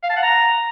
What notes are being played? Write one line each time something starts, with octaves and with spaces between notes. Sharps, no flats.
F5
A5
F#5
A#5